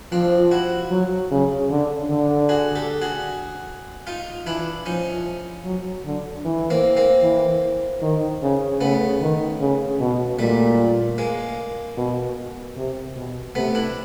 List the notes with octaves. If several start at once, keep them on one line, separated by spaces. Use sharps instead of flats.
F3 C4 D4
E4 F#4
F#3
C#3
D3
D3
F#4 G#4
G4 A4
F#4 G#4
D#4 F4
E3 D4 E4
F3 C#4 D#4
F#3
D3
E3
A#3 C4
A#3 C4
E3
D#3
C#3
C#3 A3 B3
D#3
C#3
B2
A#2 G3 A3
G#3 A#3
B2
C3
B2
C3 A3 B3
D4 E4